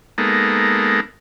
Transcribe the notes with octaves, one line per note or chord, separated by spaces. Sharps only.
G#3 A#3 B3 D#4 A4